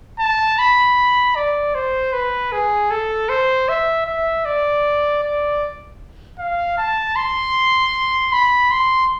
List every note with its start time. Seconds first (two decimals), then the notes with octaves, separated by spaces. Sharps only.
0.19 A5
0.58 B5
1.36 D5
1.75 C5
2.13 B4
2.52 G#4
2.90 A4
3.29 C5
3.69 E5
4.06 E5
4.45 D5
5.23 D5
6.39 F5
6.78 A5
7.16 C6
8.32 B5
8.71 C6